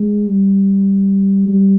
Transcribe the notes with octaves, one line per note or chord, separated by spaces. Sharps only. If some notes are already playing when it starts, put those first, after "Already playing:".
Already playing: G#3
G3
G3